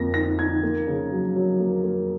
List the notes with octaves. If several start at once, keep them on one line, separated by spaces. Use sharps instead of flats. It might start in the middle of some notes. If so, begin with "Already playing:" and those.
Already playing: F2 F3 A#3 A#6
D#4 A#6
D#4 G#6
A#3
C#3
F#3
F#3
A#3
A#3